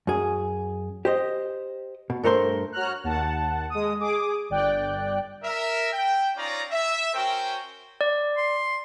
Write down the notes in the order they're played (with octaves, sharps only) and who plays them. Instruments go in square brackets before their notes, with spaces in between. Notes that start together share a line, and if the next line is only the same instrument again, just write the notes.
[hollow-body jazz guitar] F#2 G#4
G4 C5 D#5
B2
G2 A3 A#4 C5 C6
[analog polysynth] F#4 C#5 A#5 F6 F#6
D#2 F#5 A5
G#3 D#6
G#4 D6 D#6
G1 D5 G5 F#6
[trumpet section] A#4 E5
G5
C#4 D#4 F4 C#5 D5 A#5
E5
C#4 F#4 A#4 C5 G5
[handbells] D5
[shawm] C6